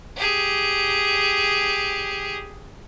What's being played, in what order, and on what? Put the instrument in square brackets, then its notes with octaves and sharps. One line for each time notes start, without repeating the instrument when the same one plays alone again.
[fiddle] G4 G#4